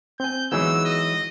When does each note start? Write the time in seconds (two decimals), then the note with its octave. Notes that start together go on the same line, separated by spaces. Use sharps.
0.20 C4 G#5 G6
0.52 E3 F#3 G#3 B3 D#4 G#4 E6
0.85 D#5